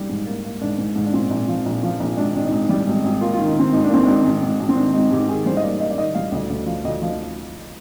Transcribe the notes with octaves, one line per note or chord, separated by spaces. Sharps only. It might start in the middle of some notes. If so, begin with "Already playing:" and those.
Already playing: G3
G#2
A#3
A#3
G#2 D4
G#2
G#2
D4
A#2 C4
A#1
F3
A#1
F3
A#1
G#1 D4
G#1 D4
D#4
G#1
G3
G#1
G#1
A#3 F4
D#3 F4
D#4
D#3 C4
G#1 D#4
D4
A#3 C4
G#1 D4
G#1
G#2
G#1
C4
D#3 D4
G#1 D#4
G#2 G4
D#3 G#4
G3 C5
D#5
A#3 D5
A#3 D#5
D5
D#3 D#5
G3 F5
D2 D#5
D2
F3
D2 D#5
F3